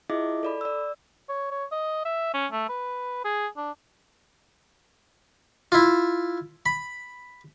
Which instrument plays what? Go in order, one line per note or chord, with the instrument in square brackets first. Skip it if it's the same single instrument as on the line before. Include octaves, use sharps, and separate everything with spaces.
[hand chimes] E4 F4 G#4 D#5 E5 D6
A4 D5 B5
D5 E6
[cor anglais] C#5
C#5
D#5
E5
C#4
A3
B4
G#4
D4
[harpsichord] E4 F4
B5